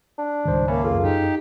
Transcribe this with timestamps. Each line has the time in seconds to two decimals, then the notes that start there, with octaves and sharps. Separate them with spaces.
0.18 D4
0.45 C#2 G#2 D#3 G3 C5
0.68 A#3 C#4 E5 A5 B5
0.84 F#2 F4 G#4 A4
1.03 D#4 G4